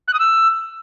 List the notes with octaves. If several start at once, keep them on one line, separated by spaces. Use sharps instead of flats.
F#6
D#6
E6